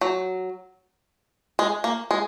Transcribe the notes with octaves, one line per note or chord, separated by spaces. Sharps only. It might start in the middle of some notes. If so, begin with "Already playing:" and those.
F#3
G#3
A#3
G#3